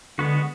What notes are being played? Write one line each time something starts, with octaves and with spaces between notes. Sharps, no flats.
D3 G#3 B3 F#4